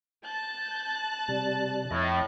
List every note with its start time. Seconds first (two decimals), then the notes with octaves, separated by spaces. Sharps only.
0.24 A5 F#6 G6 A6
1.28 C3 G3
1.90 F2 A2 D#5